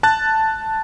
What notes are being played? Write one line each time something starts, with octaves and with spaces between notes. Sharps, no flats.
A5 F#6 A6